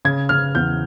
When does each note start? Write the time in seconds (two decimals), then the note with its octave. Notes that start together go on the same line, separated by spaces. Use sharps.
0.05 C#3 G#6
0.29 C#3 F6
0.55 E2 G6